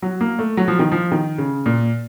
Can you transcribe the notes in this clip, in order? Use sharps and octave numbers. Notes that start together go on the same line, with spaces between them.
F#3
A#3
A3
F#3
F3
D#3
F3
D#3
C#3
A#2